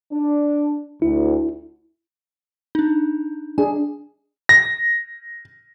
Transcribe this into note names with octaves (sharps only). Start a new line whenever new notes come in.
D4
D2 E4
D4 D#4
D4 G#4 G#5
A#6